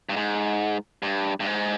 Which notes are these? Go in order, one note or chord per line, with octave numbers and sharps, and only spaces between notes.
G2
G#2
G2
G2
G#2